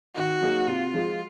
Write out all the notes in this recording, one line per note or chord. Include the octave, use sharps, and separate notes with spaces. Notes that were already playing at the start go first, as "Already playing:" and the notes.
D#3 F#4
F#3 A#3 D#4 G#4
C3 F4
F3 G#3